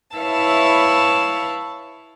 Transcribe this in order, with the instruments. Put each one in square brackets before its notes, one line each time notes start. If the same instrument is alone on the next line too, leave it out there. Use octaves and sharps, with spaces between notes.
[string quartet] E4 B4 C#5 E5 F5 A5